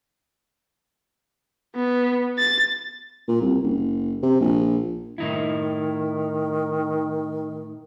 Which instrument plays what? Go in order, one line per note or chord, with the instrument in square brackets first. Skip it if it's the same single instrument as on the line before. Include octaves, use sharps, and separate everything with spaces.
[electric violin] B3
A6
[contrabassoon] A#2
C2
F#1
C3
A#1
[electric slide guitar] A2 D#4 E4 [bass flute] D#3